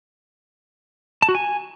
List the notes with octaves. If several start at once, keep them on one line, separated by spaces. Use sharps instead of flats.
A5
F#4
G#5